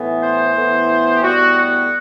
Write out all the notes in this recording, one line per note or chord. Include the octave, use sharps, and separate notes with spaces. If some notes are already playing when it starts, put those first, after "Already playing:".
Already playing: A2 E3 B3
C5
A2 E3 B3
G4
A2 G3 B3 F#4
F#4